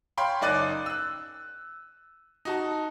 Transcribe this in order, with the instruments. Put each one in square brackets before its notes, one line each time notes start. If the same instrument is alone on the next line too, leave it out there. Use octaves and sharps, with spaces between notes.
[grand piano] C#5 F5 G5 B5 C6
F#1 D#4 D5 F#6 A6 D#7
E6 F#6
D#4 F#4 A5